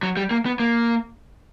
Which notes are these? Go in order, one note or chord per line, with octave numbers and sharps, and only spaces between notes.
F#3
G3
A#3
B3
A#3